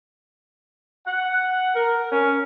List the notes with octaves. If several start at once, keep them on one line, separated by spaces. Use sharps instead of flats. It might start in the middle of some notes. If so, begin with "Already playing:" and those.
F#5
A#4
C#4